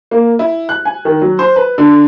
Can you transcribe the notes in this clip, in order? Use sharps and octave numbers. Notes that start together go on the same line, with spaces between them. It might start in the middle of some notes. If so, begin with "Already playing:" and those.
A#3
E4
F#6
G#5
D#3
F#3
C5
B4
D3